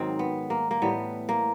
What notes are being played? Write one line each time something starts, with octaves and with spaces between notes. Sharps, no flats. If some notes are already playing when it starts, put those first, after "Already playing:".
Already playing: G#2 D#3 F#3 C4
B3
A#3
A#3
A2 E3 G3 B3
A#3